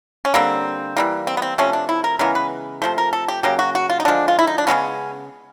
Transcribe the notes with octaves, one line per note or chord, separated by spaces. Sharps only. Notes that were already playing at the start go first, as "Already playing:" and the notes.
C#4
D3 G3 A#3 C4
E3 G3 A#3
C4
B3
C4
C3 F3 A3 C#4
D4
E4
A#4
C#3 E3 G#3 B3 A#4
B4
C3 F3 A3 C5
A#4
A4
G4
C#3 F#3 A#3 G4
F#4
F#4
F4
D#4
D3 F3 G#3 D4
F4
E4
D#4
D4
C#3 E3 G#3 B3 C#4